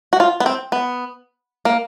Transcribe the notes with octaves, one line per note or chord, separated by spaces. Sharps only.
F#4
F4
B3
C4
B3
A#3